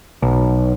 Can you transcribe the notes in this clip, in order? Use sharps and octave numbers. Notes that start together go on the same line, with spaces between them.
B1